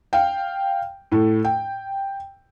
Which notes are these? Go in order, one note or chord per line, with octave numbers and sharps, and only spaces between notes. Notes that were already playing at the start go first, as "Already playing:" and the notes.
F5 G5
A2 A3
G5